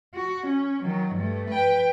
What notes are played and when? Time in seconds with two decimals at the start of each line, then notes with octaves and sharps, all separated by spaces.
0.15 F#4
0.47 C#4
0.83 D#3 F#3
1.15 G2 A3
1.50 B4 G5